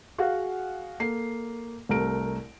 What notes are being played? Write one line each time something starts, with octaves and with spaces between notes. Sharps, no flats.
F#4 G#4 F5 F#5
A#3 A4 C7
C2 A3 A#4 D7